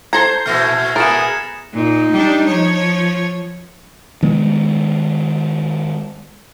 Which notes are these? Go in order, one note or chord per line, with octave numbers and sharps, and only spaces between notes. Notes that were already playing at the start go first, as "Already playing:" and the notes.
A4 C5 A#5 G#6 C7
A#2 E3 A3 F6 A#6
B3 G#4 A#4 A6 C#7 E7
A#2 D#4
G3 D4
F3 C#5
D#3 G#3 B3